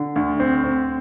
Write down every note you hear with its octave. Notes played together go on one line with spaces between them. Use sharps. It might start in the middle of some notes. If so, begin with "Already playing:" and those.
Already playing: D3
D2
C4
C4